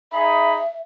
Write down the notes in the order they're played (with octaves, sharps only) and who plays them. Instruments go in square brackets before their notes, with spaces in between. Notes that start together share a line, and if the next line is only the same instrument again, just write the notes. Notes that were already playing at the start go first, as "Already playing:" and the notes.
[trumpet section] D#4 G#4 B5 [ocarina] E5